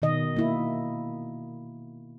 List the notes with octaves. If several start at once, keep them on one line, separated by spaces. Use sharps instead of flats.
B2 D#3 D#5
A#3 E4